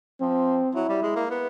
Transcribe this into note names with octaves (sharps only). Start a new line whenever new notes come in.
F3 C4
F#3 E4
G3
G#3
A#3
B3